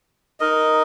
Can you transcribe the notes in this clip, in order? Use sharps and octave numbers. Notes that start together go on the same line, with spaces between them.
D#4 A#4 D#5